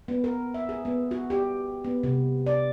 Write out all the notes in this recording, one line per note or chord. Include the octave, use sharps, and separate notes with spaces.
B3
A#4
E5
G#4
B3
F#4
G4
B3
C3
D5